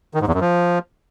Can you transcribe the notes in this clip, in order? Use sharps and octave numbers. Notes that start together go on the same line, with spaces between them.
D#3
G#2
E2
F#2
F3